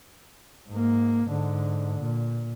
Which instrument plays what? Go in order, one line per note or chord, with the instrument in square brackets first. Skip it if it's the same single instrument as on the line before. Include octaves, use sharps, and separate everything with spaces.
[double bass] G#2 A#3
G#2 D3
A#2